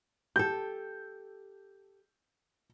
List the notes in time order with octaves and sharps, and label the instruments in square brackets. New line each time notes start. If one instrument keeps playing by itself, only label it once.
[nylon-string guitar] G4 A4 [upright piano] G6